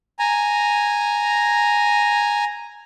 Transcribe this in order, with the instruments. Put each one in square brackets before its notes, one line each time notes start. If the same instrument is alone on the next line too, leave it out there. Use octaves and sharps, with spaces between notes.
[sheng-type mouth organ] G#5 A#5